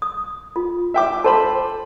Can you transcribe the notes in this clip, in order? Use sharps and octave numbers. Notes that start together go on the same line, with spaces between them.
D#6
F4
E5 G5 D6
A4 C5 A5 B5